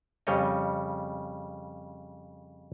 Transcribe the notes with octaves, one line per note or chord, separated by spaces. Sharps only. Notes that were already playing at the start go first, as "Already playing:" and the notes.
F2 C#3 G3 C#5 D#5